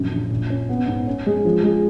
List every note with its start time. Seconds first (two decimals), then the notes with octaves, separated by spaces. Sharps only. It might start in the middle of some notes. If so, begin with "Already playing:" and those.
Already playing: A#1 F#2
0.12 A#1
0.30 A#2
0.50 C#4
0.69 B3
0.88 G#2
1.07 C#4
1.26 G#3
1.45 F3
1.63 G#3